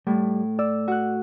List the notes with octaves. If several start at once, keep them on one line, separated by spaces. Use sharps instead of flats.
A2 G3
D5 E6
F#4 F#6